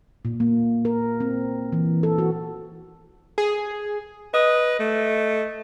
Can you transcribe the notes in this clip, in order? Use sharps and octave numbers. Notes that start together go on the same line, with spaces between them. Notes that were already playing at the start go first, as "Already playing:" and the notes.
A#2
A#3
A#4
C4
E3
A4
F#4
G#4
B4 D#5 D#6
A3